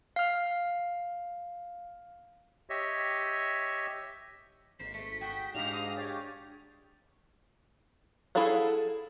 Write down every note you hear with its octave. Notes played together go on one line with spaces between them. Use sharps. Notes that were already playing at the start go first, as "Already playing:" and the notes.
F5 F6
G4 C#5 D#5 E5
G#1 A#3 C5 B6
A3
F#4 G#4 G5
G#2 G#3 D4 G4 F5 A#6 F7
D#6
G4 C#5 A6
E4 G#4 A4 F5 F#5